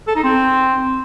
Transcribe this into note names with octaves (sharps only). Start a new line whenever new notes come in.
A4
D#4
C4